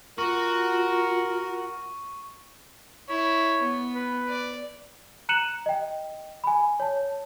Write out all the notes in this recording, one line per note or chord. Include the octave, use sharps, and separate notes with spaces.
F4 F#4 A#4 C#6
E4 C#5
B3
B4
D5
A#5 F#6 C#7 D#7 E7 F#7
D#5 G5
G#5 B5
C#5 A5